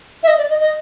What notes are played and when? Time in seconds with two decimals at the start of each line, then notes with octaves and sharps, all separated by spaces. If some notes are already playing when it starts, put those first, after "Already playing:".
0.23 E5
0.27 D#5
0.38 D5
0.49 D#5
0.60 D#5